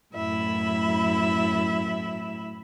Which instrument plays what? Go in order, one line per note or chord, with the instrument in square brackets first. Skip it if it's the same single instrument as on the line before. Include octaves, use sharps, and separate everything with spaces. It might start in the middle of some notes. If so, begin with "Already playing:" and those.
[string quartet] F#2 A2 E4 E5 B5